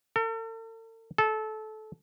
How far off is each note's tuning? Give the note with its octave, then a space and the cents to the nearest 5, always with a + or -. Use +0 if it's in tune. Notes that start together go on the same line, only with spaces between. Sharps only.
A4 +45
A4 -20